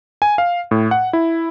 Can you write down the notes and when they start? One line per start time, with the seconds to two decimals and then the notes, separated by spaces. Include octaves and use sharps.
0.22 G#5
0.38 F5
0.71 A2
0.91 F#5
1.13 E4